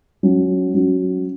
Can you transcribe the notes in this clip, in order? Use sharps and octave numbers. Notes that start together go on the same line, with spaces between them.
F#3 C#4 F#4
F#3 C#4 F#4